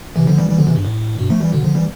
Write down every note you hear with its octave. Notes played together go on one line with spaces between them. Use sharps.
C3 E3
D3 F3
E3 G3
E3 G3
D3 F3
C3 E3
G2
A2
G2 B2
F3 A3
E3 G3
B2 D3
D3 F3
E3 G3